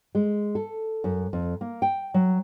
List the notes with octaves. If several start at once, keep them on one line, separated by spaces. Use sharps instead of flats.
G#3
A4
F#2
F2
A#3
G5
F#3